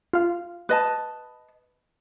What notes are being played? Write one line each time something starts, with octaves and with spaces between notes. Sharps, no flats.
F4 F5
B4 D#5 A5